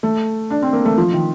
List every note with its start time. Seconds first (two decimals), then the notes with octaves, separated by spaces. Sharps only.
0.03 A3
0.50 D4
0.62 C4
0.73 A#3
0.85 A3
0.97 F3
1.13 D#3